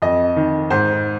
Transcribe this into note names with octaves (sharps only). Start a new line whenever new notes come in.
F2 D#5
D#3
G#2 C5